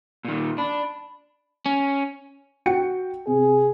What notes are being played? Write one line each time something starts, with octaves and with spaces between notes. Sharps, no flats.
A#2 D#3
D4 B5
C#4
F#4 G5 C#7
C3 G#4